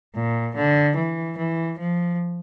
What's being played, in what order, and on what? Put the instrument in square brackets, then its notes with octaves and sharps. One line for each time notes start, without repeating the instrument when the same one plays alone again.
[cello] A#2
D3
E3
E3
F3